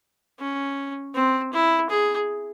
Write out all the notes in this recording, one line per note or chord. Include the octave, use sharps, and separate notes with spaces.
C#4
C4
E4
G#4